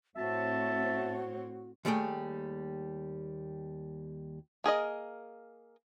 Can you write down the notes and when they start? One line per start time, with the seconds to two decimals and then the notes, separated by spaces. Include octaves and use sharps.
0.17 A2 C4 F#4 C#5 E5 A5
1.85 D#2 G3 A3 G#4 G5
4.64 A#3 G#4 A#4 D#5